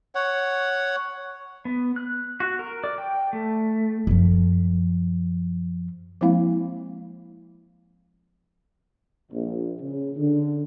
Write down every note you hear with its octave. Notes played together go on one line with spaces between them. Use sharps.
C#5 F#5
B3
F#6
F#4
A#4
D5
G5
A3
F#2 F3
F3 G#3 A#3 C4 E4 F5
A#1
C#3
D3